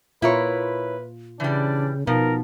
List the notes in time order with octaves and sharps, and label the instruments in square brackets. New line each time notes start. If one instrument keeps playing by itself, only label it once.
[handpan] A#2 F4 [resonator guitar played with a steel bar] E4 A#4 C#5 [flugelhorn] B4
[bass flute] C#3 [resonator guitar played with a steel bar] E3 G3 [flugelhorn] D4
[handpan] B2 B3 [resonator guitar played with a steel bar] F3 [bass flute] D#4 [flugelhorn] A#4